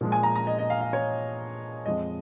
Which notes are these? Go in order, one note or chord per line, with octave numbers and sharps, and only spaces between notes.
A#2 F3 G#3
G#5
A#5
A#5
D#5
D#5
F5
F5
C#5
F2 F3 G#3 D#5